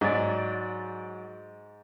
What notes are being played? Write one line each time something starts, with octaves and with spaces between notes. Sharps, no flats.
G#2 F#3 D5